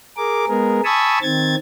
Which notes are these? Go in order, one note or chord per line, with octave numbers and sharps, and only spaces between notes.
G#4 A#4 D6
G#3 B3 G#4 A#4
G#5 A5 B5 C#6 D#6 E6
D#3 C4 G#6 A6